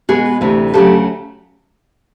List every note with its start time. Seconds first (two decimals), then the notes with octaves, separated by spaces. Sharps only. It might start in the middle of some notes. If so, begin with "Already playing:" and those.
0.09 B2 G#3 B3 F#4 G#4
0.41 D2 C3 E3 A3
0.74 D2 C#3 F#3 A3 G4 A4